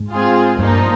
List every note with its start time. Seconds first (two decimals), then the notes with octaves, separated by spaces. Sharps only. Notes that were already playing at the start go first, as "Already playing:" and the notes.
Already playing: G#2
0.13 G#3 C4 F4 G#4
0.58 G2 A#2 F3 A#3 D#4